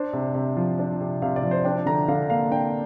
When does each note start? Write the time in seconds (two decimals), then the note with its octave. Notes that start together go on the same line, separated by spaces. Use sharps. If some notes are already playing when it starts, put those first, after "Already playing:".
Already playing: D4 C5
0.13 C3
0.35 C3
0.57 F3
0.79 D4
1.01 C3
1.22 C3 F5
1.36 D5
1.43 F3
1.51 C5
1.64 D4 G5
1.86 D3 A#5
2.08 D3 F5
2.30 A#3 F5
2.51 D4 G5